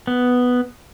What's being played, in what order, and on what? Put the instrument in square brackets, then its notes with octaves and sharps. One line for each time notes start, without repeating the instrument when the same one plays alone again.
[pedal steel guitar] B3